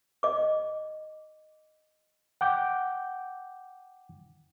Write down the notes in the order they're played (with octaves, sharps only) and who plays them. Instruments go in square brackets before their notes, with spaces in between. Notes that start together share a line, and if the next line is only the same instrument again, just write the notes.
[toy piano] D#5 D6
[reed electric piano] F#5 G5 D6 G6